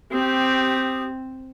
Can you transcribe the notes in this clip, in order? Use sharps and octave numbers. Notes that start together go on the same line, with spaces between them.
C4 G4 D#6